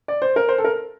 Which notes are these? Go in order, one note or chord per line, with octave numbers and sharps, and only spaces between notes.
D5
C5
A#4
C5
A4
A#4